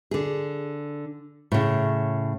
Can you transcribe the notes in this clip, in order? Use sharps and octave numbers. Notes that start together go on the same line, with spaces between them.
D3 G#4
A2 C#3